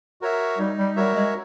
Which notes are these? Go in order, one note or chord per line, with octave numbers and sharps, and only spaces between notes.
F#4 A#4 C#5 E5
G3 D#4
G3
G3 F#4 A#4 C#5 E5
G#3